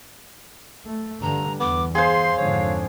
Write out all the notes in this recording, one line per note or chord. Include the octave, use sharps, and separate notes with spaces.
A3
G2 D3 A#5
E2 B3 D6
G#4 C5 F5 C6
F2 G#2 D3 C#5